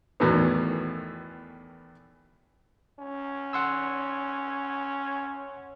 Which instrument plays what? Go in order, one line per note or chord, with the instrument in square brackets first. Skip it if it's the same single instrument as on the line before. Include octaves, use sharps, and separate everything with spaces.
[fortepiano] E2 A2 D#3 E3 F#3 B3
[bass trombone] C#4
[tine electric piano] F#5 C6 E6